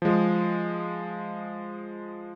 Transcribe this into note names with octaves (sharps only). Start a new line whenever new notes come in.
F3 G#3